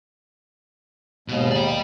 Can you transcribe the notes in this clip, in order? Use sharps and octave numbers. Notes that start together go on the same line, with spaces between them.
D#2 G#2 B2
D5 G5